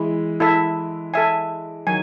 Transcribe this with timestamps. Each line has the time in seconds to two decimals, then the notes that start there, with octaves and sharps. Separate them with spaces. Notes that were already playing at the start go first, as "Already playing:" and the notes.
Already playing: E3 G#3 E4
0.40 E4 A4 E5
1.14 A4 E5 G#5
1.87 D#3 F#3 G#5